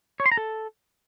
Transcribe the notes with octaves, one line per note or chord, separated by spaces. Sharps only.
C#5
C6
A#5
A4